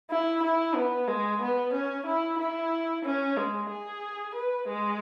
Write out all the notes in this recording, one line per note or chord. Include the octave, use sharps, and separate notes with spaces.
E4
E4
B3
G#3
B3
C#4
E4
E4
C#4
G#3
G#4
B4
G#3